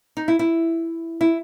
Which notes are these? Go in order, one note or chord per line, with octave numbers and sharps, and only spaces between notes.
D#4
E4
E4
E4